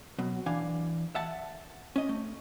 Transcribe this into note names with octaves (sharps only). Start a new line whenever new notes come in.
B2 F#3
E3 D4 F5 G#5
E5 F#5 A5
C#4 D#5
A3